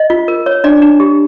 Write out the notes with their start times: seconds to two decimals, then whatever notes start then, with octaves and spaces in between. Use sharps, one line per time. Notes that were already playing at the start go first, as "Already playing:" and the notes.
Already playing: D#5
0.10 F4
0.28 A#4
0.46 C#5
0.64 D4 D5
0.82 D4
1.00 G4